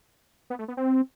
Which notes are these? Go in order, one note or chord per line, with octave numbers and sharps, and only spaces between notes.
B3
A3
B3
C4